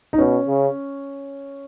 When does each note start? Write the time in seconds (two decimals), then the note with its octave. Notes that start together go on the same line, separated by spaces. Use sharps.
0.13 D#4
0.18 B2 C#4
0.48 C#3